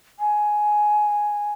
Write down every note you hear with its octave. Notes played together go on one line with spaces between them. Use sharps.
G#5